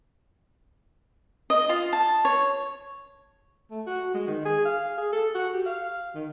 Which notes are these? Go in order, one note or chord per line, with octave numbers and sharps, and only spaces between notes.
D#5
F4
A5
C#5
A3
F#4
G#3
D#3
G#4
F5
G#4
A4
F#4
G4
F5
D#3